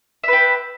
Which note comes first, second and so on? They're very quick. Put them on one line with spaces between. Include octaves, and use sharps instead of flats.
E5 B4 G4